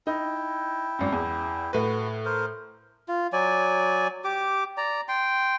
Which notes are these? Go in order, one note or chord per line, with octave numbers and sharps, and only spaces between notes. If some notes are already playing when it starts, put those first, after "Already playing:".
D#4 E4 G5
G#1 F#2
E2
A2 F#4 B4
A#4 C5
F4
F#3 D5 G#5
G4 D6
D5 A#5
G5 C6